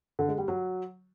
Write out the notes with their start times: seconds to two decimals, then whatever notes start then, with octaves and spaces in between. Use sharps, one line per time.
0.19 D3
0.29 G#3
0.38 G3
0.48 F#3